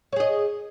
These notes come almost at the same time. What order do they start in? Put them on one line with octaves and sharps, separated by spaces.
C#5 G#4 D#5